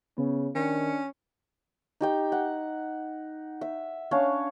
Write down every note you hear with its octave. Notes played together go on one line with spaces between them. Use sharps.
C#3 B3 C#4
D#3 C#4 D4 C#7
D#4 G4 G5
F#5
E5
C#4 D4 C#5 F5